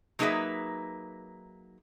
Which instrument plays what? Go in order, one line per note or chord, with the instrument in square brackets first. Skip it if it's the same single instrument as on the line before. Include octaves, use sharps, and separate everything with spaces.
[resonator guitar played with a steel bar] F#3 A#3 D#4 G#4 B4 E5